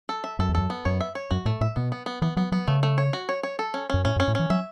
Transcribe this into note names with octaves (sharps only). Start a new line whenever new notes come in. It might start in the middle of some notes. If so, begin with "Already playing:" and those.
A4
E5
F#2 A4
E2
F#2 A4
B3
F#2 C#5
E5
C#5
F#2 F#4
A2 A3
A2 E5
B2 B3
B3
B3
E3 B3
F#3 B3
F#3 B3
C#3 A3
A3
C#5
F#4
C#5
C#5
A4
C#4
F#2 C#4
A2 C#4
F#2
C#4
A2
E3 C#4
F#3 E5